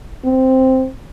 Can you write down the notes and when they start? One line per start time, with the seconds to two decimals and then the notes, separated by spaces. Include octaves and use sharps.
0.25 C4